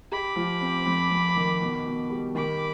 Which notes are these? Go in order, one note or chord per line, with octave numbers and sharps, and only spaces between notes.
G4 B5 D6
F3
C4
F2
F2
D#3
B2
B2
G3
D#3 B5 D6